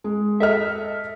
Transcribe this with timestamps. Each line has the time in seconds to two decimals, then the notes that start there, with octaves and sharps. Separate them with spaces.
0.04 G#3
0.40 A4 D#5 E5 F6